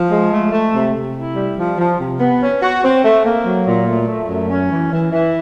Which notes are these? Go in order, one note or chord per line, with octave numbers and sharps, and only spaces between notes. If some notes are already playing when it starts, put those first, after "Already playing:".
Already playing: F3
G#3
A3
A3
C3
C3
E4
G3
F3
F3
C3
B3
C#4
F#4
C4
A3
A#3
F#3
A#2
A3
A3
F#2
C#4
E3
E3
E3